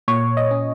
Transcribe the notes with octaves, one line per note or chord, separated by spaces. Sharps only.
A#2 C#5
D#5
C#4